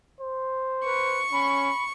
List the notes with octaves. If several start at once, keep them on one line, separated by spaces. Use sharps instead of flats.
C5
B4 C#6
C#4 B5